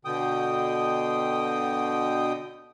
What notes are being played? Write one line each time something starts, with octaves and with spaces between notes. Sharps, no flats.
B2 D3 G5 D#6